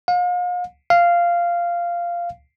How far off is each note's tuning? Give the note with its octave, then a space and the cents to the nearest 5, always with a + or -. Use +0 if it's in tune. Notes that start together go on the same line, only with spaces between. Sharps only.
F5 +40
F5 -10